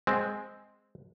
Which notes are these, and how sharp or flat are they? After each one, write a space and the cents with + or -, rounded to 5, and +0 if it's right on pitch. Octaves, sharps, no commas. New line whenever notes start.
G#3 +0 C4 -5